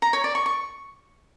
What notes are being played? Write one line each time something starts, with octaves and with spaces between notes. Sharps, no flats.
A#5
C#5
D5
C#6
C#6